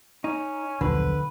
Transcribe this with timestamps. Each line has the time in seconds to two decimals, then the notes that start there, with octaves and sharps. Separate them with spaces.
0.24 C#4 D#4
0.81 D#1 B1 D3 F3 B4